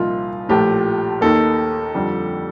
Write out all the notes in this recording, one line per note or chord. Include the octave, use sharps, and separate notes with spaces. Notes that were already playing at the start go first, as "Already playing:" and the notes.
Already playing: C2 A#2 F3 C4 D#4 F4
A#1 A2 F3 A3 G4
D#2 D#3 A#3 A4
F2 D3 G3